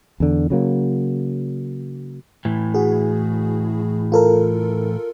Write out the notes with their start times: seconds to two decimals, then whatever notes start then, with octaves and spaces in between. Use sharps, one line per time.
0.20 E2 D3
0.50 C#3 F#3 A#3
2.45 A2 E3
2.74 F#4 G#4
4.12 F4 A4 A#4